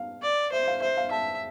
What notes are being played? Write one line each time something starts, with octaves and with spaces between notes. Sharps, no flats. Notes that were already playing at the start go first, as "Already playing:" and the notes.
Already playing: F5
D5
C5 E5
F5
C5 E5
F5
E5 A5